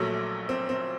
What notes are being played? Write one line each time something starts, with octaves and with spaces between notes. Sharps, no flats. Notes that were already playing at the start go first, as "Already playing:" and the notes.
Already playing: A#1 A#2 F#3 A3
C4
C4